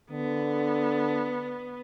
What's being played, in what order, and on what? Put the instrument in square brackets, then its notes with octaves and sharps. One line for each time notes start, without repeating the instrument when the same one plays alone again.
[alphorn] D3 [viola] B3